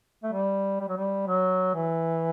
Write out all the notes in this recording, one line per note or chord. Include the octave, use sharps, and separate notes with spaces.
A3
G3
G3
F#3
G3
F#3
E3